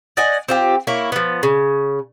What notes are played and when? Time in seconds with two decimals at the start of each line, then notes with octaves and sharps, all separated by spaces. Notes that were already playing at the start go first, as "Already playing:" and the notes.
0.17 D5 D#5 F#5 G#5
0.48 C4 F4 G4
0.87 A#3 E4 C#5
1.12 F3 B3
1.43 C#3